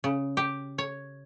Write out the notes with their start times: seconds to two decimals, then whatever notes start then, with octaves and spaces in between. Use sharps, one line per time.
0.04 C#3
0.37 G4
0.78 C#5